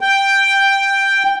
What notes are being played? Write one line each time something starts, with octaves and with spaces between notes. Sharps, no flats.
G5